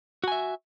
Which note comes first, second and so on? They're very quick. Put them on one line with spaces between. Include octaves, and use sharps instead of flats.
F#4 G#5 E5